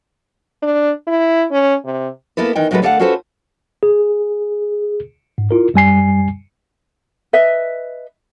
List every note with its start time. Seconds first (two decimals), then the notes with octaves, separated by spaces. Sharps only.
0.63 D4
1.07 E4
1.51 C#4
1.85 C3
2.37 A#3 B3 E4 A4 B4
2.55 D#3 E3 G5
2.71 A2 F#3 G#3 G#4 A4 B4
2.82 D3 A3 A4 D5 F5 F#5
2.99 C#4 F4 F#4 A4 B4 C5
3.83 G#4
5.38 G#2
5.51 E4 F4 A#4
5.74 F#2 G3 G#5 C7
7.33 B4 D#5 E5